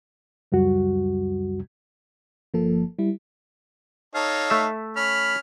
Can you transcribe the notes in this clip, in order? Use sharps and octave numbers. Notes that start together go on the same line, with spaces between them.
C#2 F#2 G3 F#4
G1 F3 A#3 A4
G3 E4
D#4 A4 C#5 F5
A3 E5
C#4 B5 F6